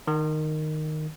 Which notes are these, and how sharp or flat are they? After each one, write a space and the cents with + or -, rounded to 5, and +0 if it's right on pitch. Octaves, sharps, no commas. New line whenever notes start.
D#3 -10